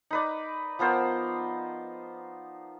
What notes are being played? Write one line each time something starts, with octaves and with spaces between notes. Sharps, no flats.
D#4 B4 D5
F3 B3 A#4 C5